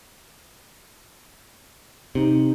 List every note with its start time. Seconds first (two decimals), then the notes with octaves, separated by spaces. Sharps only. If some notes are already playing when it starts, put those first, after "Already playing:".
2.15 C3 D#4